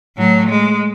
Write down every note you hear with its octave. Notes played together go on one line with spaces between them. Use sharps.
A2 F#3
G#3